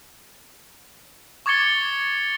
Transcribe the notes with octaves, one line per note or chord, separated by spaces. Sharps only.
C#6 D6 G#6 A6 C#7 G7